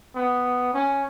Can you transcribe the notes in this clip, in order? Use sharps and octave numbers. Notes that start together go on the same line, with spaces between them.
B3
C#4